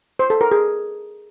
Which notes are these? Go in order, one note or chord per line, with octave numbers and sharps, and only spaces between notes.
C5
A4
A#4
G#4